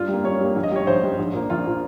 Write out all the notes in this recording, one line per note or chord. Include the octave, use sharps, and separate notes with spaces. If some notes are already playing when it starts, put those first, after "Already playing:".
Already playing: G2 F4
G3 A#3
G2 C#5
G3 A#3
A#1
D#5
G#2 G3 C#5
A#1 C5
G#2 G3
A#1
A#2 F3 A#3
A#1 F4
A#2 F3 A#3